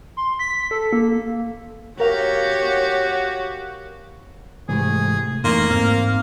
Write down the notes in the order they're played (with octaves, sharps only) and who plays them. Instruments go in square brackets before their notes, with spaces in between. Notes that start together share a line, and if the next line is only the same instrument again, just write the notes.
[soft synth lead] C6
B6
A4
A#3
[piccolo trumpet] F#4 [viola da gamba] G4 [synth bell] A#4 F5 [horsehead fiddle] C#5
[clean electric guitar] G#2 E3 A3 [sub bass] C3 [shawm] G#4
[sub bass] F2 [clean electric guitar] E3 A3 D#4 [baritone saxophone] A#3 [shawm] C6
[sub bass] G#2 [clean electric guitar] C4 [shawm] F5